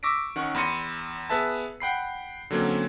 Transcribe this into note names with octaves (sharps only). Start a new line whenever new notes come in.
C#6 D6 E6 A#6 B6 D7
D#3 C#4 F#5 C#6
E2 B5 C6 A#6 C#7 D#7
B3 G#4 B4 E5 A5
F#5 G5 B5 C7
D3 F#3 A#3 C4 C#4